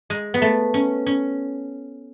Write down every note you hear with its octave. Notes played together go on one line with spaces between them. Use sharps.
G#3
B3
A3
C#4
C#4